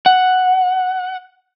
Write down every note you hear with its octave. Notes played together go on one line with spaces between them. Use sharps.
F#5